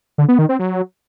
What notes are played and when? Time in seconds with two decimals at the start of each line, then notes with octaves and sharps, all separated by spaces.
0.18 D3
0.28 B3
0.39 D#3
0.49 C4
0.59 F#3